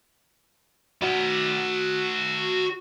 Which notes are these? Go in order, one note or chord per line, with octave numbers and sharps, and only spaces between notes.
F#4 D5